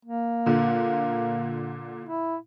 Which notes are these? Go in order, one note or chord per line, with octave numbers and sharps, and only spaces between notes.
A#3
A#2 D3
E4